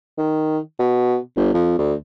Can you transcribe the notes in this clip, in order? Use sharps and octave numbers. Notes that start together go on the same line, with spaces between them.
D#3
B2
G1
F2
D2